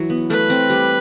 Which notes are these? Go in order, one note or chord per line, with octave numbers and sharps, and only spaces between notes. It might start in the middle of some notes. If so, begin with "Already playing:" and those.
Already playing: E3 F#3
B3
A3 B4
C4
G3